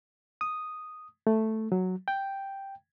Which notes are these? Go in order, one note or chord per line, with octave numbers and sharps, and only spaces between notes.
D#6
A3
F#3
G5